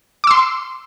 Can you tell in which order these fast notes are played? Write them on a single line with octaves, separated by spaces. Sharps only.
D6 E6 C6